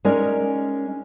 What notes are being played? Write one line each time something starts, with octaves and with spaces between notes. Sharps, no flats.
G#3 C#4 D#4 A#4 D5